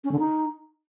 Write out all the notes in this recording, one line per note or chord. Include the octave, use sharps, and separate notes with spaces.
C#4
D3
D#4